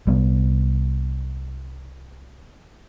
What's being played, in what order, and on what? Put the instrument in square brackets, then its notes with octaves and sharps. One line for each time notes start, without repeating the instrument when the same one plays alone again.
[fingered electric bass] C2 G3 B3